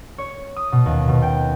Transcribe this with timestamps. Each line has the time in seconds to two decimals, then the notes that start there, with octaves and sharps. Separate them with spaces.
0.18 C#5
0.56 D#6
0.72 B2
0.86 D#2
1.08 B2
1.22 G5